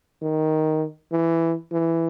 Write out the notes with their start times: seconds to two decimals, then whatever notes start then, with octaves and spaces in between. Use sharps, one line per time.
0.22 D#3
1.12 E3
1.72 E3